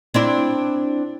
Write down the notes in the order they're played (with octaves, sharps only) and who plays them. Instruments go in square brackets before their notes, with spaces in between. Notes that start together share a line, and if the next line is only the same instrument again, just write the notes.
[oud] C4 D4 E4